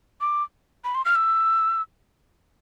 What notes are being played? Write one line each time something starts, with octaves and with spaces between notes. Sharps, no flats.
D6
B5
C6
F6
E6